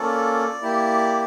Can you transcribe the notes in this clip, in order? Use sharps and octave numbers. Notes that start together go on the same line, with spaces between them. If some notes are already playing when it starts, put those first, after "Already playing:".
Already playing: A#3 C#4 F4 A4 D5
A#3 E4 G4